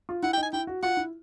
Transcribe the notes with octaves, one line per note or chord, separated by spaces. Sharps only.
F4
E4 F#5
G5
D#4
G#5
E4 G5
F#4
F4 F#5
E4